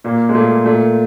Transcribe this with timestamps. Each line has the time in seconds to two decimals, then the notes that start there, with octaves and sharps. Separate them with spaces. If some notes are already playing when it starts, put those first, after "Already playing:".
0.04 A#2 A#3
0.29 G#3
0.34 A#2 A3
0.65 A#2 A3